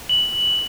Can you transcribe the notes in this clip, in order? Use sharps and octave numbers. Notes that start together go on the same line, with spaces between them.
F#7